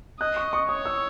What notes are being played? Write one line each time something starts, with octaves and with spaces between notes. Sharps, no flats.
D#5 F#6
C#6
C#6
C#5 D#6
E6